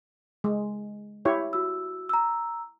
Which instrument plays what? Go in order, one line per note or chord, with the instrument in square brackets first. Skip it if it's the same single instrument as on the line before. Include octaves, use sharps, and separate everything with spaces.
[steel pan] G#3
E4 G4 C#5
[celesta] F#4 E6
A#5 E6